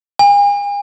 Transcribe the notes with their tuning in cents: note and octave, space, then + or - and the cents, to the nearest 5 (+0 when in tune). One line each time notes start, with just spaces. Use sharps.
G#5 -40